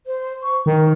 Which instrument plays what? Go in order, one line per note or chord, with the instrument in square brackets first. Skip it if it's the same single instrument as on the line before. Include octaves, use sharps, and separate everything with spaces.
[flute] C5
C#6
[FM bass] D#3 [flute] A#4